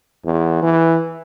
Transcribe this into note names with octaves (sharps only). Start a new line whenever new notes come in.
E2
E3